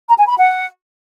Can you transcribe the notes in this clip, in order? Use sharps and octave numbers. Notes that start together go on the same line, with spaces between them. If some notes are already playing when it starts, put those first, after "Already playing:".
A#5
G#5
B5
F#5